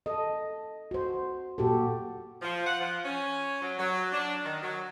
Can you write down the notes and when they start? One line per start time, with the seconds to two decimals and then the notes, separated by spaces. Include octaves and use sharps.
0.06 A4 D#5
0.91 F#4 C5
1.58 A#2 F#4 G4 A4
2.42 F3
2.67 F#5
2.80 F3
3.05 C#4
3.62 F#3
3.79 F#3
4.12 D4
4.45 D#3
4.63 F#3